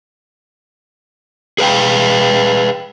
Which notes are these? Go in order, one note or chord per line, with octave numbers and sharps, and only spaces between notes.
G#4 B4 F5 G5